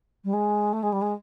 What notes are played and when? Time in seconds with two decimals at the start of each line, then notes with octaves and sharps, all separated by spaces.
0.24 G3
0.33 G#3
0.73 A3
0.82 G#3
0.92 G3
1.01 G#3